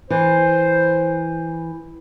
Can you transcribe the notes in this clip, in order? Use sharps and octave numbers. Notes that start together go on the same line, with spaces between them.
E3 C5